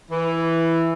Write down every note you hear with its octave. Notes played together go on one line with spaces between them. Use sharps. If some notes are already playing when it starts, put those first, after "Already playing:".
E3